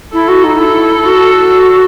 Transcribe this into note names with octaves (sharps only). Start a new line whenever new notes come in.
E4 A4
F#4
D#4
E4 A4
E4
F#4